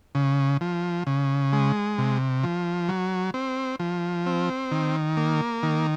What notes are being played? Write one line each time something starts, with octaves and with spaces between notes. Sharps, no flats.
C#3
F3
C#3
G#3
C3
F3
F#3
C4
F3
C4
D#3
A#3
D#3